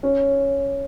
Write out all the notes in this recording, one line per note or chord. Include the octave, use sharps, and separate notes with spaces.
C#4